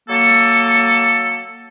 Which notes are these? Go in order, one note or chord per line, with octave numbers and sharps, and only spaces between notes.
F#3 A#3 A4